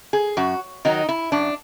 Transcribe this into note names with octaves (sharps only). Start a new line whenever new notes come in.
G#4
F#2 F#4
D#3 F#3 D#4
E4
F#2 D4